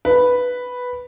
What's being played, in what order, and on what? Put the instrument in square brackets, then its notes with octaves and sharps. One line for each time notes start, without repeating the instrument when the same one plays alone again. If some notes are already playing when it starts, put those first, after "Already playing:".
[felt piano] B4